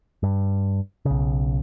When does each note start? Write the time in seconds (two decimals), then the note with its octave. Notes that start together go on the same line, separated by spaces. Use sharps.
0.23 G2
1.05 B1 C#3